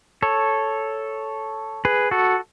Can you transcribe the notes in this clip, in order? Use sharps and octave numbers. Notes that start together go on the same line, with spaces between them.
A4 C#5
G#4 B4
F#4 A4